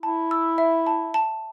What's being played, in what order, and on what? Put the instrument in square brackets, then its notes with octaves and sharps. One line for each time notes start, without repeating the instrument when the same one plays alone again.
[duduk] E4 [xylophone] A5
[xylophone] E6
E5
A5
A5